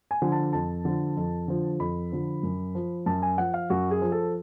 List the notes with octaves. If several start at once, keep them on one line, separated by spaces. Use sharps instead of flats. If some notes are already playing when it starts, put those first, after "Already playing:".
G#5
D3 F3
A5
F2 A5
D3 F3
F2
D3 F3
F2 B5
D3 F3
F#2
F3
F#2 A5
G#5
F3 F#5
F5
F#2 F#4
G#4
F3
A4